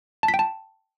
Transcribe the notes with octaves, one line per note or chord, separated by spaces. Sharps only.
A5
B6
G5
A5